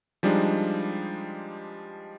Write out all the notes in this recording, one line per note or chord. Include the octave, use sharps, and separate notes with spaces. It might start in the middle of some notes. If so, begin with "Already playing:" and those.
F3 G3 G#3 D4 D#4